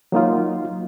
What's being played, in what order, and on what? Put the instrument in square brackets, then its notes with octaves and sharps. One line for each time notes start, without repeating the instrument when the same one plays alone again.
[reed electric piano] F#3 A#3 D#4 F4